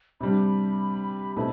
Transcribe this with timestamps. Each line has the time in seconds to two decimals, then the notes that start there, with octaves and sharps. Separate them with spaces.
0.21 C3 G3 D4 B5
1.36 B2 A3 C4 E4 B5